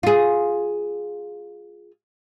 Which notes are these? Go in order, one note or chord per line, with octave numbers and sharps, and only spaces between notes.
F4 G#4